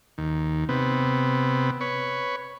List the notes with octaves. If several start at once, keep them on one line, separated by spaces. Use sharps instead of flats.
D#2
C3 B3
B4 C#5